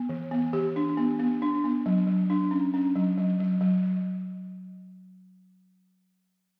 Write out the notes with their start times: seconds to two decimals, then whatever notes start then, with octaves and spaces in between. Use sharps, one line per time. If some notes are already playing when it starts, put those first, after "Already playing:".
Already playing: B3
0.09 E3
0.31 B3
0.53 E3 G4
0.76 D4
0.97 B3
1.19 B3
1.42 D4
1.64 B3
1.86 F#3
2.07 F#3
2.30 D4
2.51 C#4
2.74 C#4
2.96 F#3
3.18 F#3
3.40 F#3
3.61 F#3